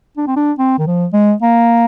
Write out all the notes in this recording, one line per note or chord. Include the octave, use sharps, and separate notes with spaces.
D4
C4
D4
C4
D#3
F3
G#3
A#3